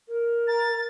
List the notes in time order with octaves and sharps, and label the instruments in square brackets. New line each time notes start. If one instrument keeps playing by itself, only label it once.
[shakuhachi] A#4
[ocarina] A#5 [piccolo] A6